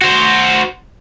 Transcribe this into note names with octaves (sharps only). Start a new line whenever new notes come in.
F#4 C5